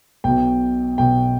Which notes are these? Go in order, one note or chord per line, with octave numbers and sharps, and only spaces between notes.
B1 B2 G5
B1 B2 G5